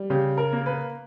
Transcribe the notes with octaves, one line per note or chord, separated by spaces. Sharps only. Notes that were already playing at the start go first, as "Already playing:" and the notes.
Already playing: G3
C#3 G4
A#4
A#3
B4